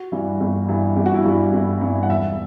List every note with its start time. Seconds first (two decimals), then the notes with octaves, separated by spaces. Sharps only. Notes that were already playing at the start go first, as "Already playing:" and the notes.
Already playing: F#4
0.12 G2 E3 G3
0.40 G1
0.69 G2 E3 G3
0.96 G1 G4
1.06 F#4
1.14 E4
1.23 G2 E3 G3 F#4
1.53 G1
1.81 G2 E3 G3
2.03 F#5
2.09 E1 E5